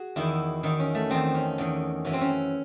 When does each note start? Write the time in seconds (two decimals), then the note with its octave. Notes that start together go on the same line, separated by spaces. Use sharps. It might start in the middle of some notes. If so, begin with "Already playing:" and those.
Already playing: F#4 G#4
0.16 E2 D#3 E4
0.63 E2 D#3 D#4
0.80 C#4
0.95 A3
1.10 E2 D#3 C4
1.35 C#4
1.58 E2 D#3
2.05 F#2 E3 C#4
2.13 C4
2.21 C#4